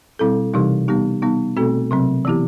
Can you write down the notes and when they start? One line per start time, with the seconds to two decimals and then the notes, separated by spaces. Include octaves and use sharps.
0.19 B2 G3 C4 E4 A4
0.54 C3 E3 G3 D#4 G4
0.88 G3 B3 D#4 G4
1.22 G3 B3 D#4
1.57 B2 A3 C4 F#4 A4
1.91 C3 F#3 C4
2.25 E3 B3 E4 G4